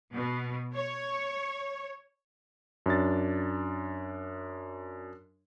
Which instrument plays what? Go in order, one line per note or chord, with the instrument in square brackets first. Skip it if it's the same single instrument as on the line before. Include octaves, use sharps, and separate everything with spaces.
[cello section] B2
C#5
[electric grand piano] F#2 D4 A6